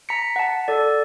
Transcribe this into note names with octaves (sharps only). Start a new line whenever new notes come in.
A#5 B6 C#7
F#5 A5
A4 D5